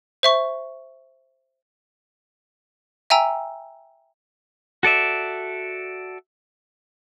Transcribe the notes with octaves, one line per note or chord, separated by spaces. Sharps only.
C5 E5 C#6
E5 G5 G#5 A#5 E6
F#4 A4 D5 E5